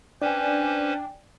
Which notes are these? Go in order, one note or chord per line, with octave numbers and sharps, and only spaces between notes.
C#4 D4 B4 C5 D5 G5 G#5